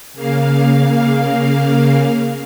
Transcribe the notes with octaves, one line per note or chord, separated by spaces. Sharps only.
C#3 A#3 F5